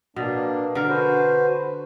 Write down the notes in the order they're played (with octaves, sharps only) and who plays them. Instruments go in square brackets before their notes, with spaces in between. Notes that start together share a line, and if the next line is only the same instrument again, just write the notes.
[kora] B2 [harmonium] A#3 D4
[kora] D3 A#4
[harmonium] F#4 B4 C5